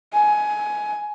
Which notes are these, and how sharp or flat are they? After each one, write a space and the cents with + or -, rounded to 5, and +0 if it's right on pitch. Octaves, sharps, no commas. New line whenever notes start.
G#5 +15